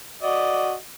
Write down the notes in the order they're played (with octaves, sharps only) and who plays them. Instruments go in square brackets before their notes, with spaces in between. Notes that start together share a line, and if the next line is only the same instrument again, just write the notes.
[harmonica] F#4 D5 D#5